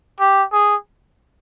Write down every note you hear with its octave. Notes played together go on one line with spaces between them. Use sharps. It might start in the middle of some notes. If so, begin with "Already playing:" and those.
G4
G#4